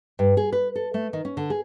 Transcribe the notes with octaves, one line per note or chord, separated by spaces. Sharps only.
G2
G#4
B4
A4
A3
D#3
C#4
D3
G#4